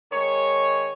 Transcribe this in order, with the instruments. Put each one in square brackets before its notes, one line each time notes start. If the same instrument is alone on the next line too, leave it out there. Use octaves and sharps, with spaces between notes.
[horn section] D#3 G#3 C#5